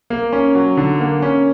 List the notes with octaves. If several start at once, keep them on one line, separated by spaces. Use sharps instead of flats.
A#3
C#4
F#3
D3
A#3
C#4